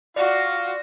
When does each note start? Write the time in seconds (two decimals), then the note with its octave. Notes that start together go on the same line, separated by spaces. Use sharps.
0.16 F4 F#4 D5 F5